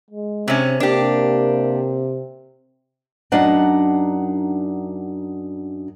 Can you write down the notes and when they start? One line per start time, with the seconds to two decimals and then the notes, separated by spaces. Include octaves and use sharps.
0.10 G#3
0.48 C3 C4 C#4
0.80 C3 A#3 D4 G4
3.32 F#2 D4 D#4 F#5